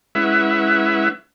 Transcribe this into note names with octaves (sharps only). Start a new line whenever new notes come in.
G#3 C#4 E4 B4 E5 F#5